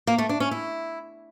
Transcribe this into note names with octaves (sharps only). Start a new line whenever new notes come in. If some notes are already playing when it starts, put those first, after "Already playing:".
A#3
A3
D4
C#4
E4